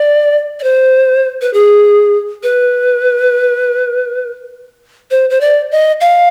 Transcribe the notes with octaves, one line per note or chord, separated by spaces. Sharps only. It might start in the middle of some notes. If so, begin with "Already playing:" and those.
Already playing: D5
D5
C5
B4
G#4
B4
C5
C5
D5
D#5
F5